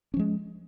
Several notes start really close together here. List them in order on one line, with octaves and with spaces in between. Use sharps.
C#4 F3 G#3